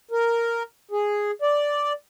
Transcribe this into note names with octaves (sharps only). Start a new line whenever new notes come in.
A#4
G#4
D5